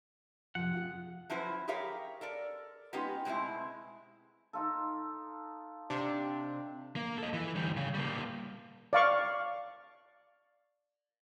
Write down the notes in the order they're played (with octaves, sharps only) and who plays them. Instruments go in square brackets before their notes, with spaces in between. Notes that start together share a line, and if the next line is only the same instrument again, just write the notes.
[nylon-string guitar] C3 F3 [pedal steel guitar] F#5
[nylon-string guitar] F4 F#4 G#4
[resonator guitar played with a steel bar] F3 F#3 C#4 E4 B4 C5
G4 G#4 A#4 C#5 E5 F5
A4 A#4 D5
G#3 B3 C#4 D#4 F4 G4
B2 G#3 A3 C4 E4
[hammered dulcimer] D#4 F4 A4
[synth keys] C3 D4
[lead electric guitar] A#3
A4 D#5
E3
D2 G3
C#3
G3 A#3
[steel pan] D5 F5 C#6